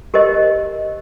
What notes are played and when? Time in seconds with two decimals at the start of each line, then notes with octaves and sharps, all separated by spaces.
0.14 G4 A#4 C5 D#5